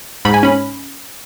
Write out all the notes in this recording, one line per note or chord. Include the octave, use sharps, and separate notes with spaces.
G#2 B5
G#5
C#4 B5